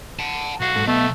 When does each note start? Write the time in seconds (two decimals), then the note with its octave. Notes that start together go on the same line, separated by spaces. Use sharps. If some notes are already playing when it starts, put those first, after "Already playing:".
0.19 F#5 A5
0.60 B1 F#4 F5
0.76 G#2 A4
0.87 A3 B3 D#5